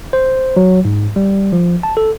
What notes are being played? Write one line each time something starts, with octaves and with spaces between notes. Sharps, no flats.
C5
F#3
G#2
G3
F3
A5
A4